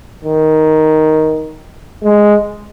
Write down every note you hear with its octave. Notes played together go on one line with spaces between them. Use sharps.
D#3
G#3